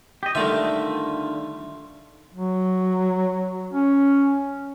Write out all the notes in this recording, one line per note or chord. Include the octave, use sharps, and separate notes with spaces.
G4 D#5
D3 D#3 G3 A3 F4 E5
F#3
C#4